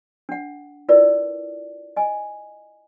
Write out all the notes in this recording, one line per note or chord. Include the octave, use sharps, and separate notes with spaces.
D4 F#5
E4 F4 A#4 B4 D5
D#5 G#5